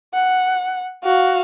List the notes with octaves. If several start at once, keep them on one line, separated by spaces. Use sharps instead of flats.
F#5
F#4 F5